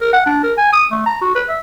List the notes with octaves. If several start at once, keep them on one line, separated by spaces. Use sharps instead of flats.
A#4
F#5
D4
A#4
G#5
D#6
A3
A#5
F#4
B4
E5